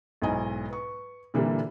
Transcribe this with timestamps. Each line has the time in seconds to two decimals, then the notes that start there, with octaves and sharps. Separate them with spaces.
0.22 B1 G#2 E4 D#5 G#5
0.70 B4 C#6
1.34 A#2 D3 E3 G3 A#3